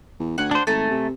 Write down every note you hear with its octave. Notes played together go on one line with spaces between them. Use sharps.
E2
D2 F#5 G#5
D4 C5 F#5
G#1 A3 A4 G#5 A#5
C3